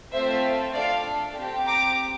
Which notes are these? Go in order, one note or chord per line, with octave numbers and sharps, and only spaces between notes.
A3 C4 F4 A4 C5 E5
D4 A4 D5 F5
C4 G4
A#5 D6